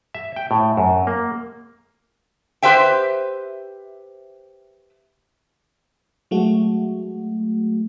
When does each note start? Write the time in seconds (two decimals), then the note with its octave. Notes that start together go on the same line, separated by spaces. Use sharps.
0.15 E5
0.36 G5
0.51 A2
0.77 F#2
1.07 A#3
2.63 G4 B4 C5 E5 G5
6.31 F#3 G#3 A3 F#4